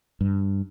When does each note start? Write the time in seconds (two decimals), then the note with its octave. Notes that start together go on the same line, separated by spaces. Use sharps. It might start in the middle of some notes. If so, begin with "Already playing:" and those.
0.21 G2